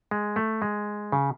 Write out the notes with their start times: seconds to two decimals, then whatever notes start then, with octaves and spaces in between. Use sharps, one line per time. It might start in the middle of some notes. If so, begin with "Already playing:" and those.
0.11 G#3
0.36 A3
0.62 G#3
1.12 C#3